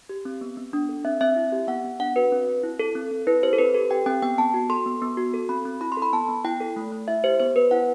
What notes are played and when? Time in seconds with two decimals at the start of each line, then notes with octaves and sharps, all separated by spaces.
0.09 G4
0.25 C4
0.41 B3
0.57 B3
0.73 D4
0.89 A4
1.05 C4 E5
1.21 C4 E5
1.36 E4
1.52 G4
1.68 B3 F#5
1.84 B3
2.00 D4 F#5
2.16 F#4 B4
2.32 C4
2.48 C4
2.63 E4
2.79 A4
2.95 C4
3.11 C4
3.27 E4 B4
3.43 G4 C5
3.53 A4
3.58 C4 B4
3.74 G4 A4
3.90 G4 G5
4.06 C4 G5
4.22 B3 G5
4.38 B3 A5
4.54 F#4
4.69 A4 C6
4.86 B3
5.02 B3
5.17 F#4
5.34 A4
5.49 C4 B5
5.65 C4
5.81 E4 B5
5.92 C6
5.97 A4
6.02 B5
6.13 B3 A5
6.29 B3
6.45 E4 G5
6.60 A4
6.76 A3
6.92 A3
7.08 E4 E5
7.24 G4 C5
7.40 B3 C5
7.56 B3 B4
7.71 E4 F#5